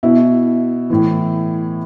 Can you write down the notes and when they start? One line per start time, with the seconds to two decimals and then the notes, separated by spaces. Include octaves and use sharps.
0.03 B2 E4
0.90 A2 E3